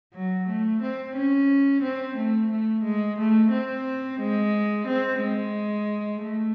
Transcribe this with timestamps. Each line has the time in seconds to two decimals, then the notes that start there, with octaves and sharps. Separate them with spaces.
0.15 F#3
0.48 A3
0.82 C4
1.16 C#4
1.83 C4
2.17 A3
2.51 A3
2.84 G#3
3.19 A3
3.52 C4
4.20 G#3
4.87 C4
5.21 G#3
6.23 A3